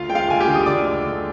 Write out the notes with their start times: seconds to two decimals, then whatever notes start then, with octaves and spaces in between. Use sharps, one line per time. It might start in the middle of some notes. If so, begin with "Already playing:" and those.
Already playing: D2 F4 F5
0.09 G#3 G5
0.15 F4 F5
0.29 D2 G#5
0.40 G4 G5
0.47 D3
0.55 D#6
0.66 D2 D5 D6
0.85 G#3
1.04 D2